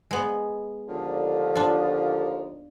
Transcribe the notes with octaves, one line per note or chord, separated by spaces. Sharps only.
G#3 B3
D#2 D3 F3
D4 F4